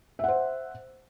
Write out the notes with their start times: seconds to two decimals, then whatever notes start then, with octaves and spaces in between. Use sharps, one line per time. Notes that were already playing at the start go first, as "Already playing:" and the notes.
0.19 E5
0.24 F#5
0.28 C5